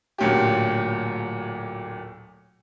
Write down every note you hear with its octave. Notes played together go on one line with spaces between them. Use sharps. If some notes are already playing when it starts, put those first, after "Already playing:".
D1 D2 A#2 C#4 G4